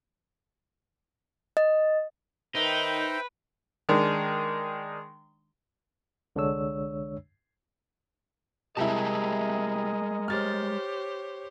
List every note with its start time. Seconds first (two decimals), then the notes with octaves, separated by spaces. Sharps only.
1.57 D#5
2.55 D#3 D#4 B4 C5 E5 G5
3.89 D#3 G#3 D4
6.36 C2 D3 G#3 D4 C#5 E6
8.77 C3 G3 G#3 E4 G#4 A#4 D#5 A5
10.28 G4 C5 C#5 F6 A6